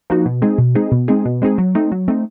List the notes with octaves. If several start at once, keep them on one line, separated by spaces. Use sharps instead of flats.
F3 A#3 D#4 F#4
B2
G#3 C4 D#4 G#4
B2
G#3 C4 D#4 G#4
B2
G#3 C4 D#4 G#4
B2
G#3 C4 D#4 G#4
F#3
A3 C4 D#4
F#3
A3 C4 D#4